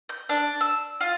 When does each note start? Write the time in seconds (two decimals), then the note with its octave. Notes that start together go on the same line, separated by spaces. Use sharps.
0.09 G6
0.29 D4
0.61 E6
1.01 F4